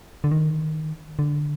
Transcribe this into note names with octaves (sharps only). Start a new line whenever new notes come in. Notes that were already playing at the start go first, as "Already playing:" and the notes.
D3
D#3
D3